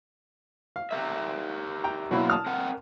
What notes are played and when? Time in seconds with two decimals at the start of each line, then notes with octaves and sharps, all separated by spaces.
0.76 F5
0.91 G4 A#4 E5
1.84 G5 A#5
2.11 B2 F#3 A#3 D4 E4 B5
2.30 A5 D#6 F6
2.46 C4 A#4 F#5